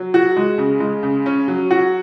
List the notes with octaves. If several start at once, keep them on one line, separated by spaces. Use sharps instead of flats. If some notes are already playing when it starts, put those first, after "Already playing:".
Already playing: F#3
F#4
G#3
C#3
G#3
C#3
C#4
F#3
F#4